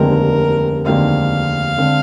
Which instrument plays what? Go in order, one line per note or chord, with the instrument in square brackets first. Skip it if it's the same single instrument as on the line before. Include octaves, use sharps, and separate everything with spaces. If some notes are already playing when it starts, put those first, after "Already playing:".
Already playing: [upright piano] F1 D#2 D3 G#3 C4 [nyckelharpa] A#4
[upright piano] F1 D#2 D3 G#3 C4 [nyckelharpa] F5
[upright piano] D3 G#3 C4